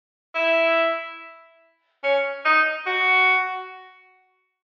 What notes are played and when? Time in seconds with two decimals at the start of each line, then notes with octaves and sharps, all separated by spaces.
0.35 E4
2.03 C#4
2.45 D#4
2.86 F#4